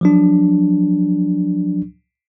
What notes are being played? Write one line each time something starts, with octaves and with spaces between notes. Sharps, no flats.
F3 F#3 D4